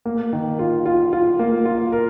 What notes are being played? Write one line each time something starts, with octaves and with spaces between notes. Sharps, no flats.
A#3
D#3
F4
F4
F4
A#3
F4
A#4